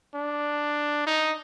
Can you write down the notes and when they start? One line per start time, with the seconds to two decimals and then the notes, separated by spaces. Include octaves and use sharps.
0.15 D4
1.07 D#4